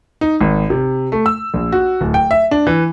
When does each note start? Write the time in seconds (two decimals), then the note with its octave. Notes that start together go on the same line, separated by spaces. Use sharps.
0.21 D#4
0.40 G#1
0.70 C3
1.12 A3
1.26 E6
1.54 A#1
1.72 F#4
2.01 D1
2.14 G5
2.31 E5
2.51 D4
2.67 E3